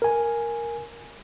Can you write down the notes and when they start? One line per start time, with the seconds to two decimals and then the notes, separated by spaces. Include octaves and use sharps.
0.02 A#4 G#5